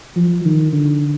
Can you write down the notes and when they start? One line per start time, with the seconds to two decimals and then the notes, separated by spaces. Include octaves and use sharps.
0.16 F3
0.45 D#3
0.73 D3